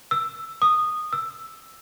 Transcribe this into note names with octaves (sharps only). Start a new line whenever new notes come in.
E6
D#6
E6